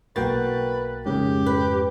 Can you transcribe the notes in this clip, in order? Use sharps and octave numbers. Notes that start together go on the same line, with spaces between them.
B1 A#3 F#4 B4 G5 A6
F2 G#2 C#3 G4
B4